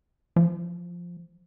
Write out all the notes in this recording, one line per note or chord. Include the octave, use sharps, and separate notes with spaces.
F3